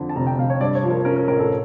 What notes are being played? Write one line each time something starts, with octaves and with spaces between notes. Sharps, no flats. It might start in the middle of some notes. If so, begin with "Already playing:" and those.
Already playing: F2 D3
A5
F1 A#5
G5
F1 F5
C#5
G2 D5
C#5
F3
A#4
C#4 A#4
A#4
A1 A#4
A4